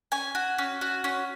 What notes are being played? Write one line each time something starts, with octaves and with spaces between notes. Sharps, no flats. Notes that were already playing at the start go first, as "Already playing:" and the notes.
C#4 G#5
F#4
C#4
F#4
C#4